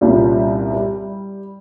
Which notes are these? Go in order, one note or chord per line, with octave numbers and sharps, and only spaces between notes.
C2 A#2 G3 C#4 F4
G3